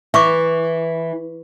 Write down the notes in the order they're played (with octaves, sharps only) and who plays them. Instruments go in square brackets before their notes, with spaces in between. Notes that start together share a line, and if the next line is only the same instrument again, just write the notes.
[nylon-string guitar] E3 [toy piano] E5 C#6 D6